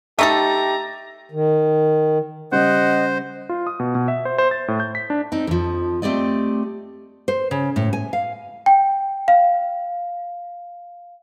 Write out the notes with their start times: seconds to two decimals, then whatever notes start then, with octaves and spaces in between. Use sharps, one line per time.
0.19 A3 D#4 G4 A4 E5 A#5 A6
1.32 D#3
2.52 C#3 G3 C5 D#5 F#5
3.49 F4
3.67 D#6
3.80 B2
3.95 B2
4.08 E5
4.25 C5
4.38 C5
4.51 A6
4.68 A2
4.80 G6
4.95 B6
5.10 D4
5.32 C4 D#4
5.47 F2 F3
6.02 A3 C4 G4 D5 D#5
7.28 C5
7.51 C#3
7.76 A2
7.93 G#5
8.13 F5
8.66 G5
9.28 F5